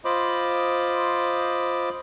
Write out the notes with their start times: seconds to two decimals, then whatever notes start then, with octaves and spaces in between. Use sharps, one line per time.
0.05 F4 C5 D#5 B5 D6